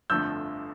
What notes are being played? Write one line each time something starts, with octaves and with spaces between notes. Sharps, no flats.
G1 F2 D3 F3 A3 E6 G6